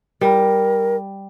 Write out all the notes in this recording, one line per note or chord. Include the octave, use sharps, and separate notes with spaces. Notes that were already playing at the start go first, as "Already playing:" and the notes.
G3 A#4